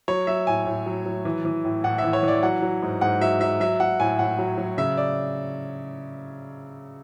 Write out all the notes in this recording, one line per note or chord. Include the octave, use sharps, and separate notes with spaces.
F#3 C#5
F#3 E5
A2 G#5
A2
F#3
F#3
E3
E3
A2
A2 F#5
E5
E3
C#5
E3 D5
F#3 F#5
F#3
G#2
G#2 F#5
F#3 E5
F#3 E5
F#3 E5
F#3 F#5
A2 G#5
A2 F#5
F#3
F#3
C#3 E5
D5